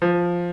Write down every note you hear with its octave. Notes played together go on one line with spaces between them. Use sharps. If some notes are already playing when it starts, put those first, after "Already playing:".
F3